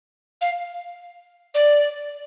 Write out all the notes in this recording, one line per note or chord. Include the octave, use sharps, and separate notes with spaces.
F5
D5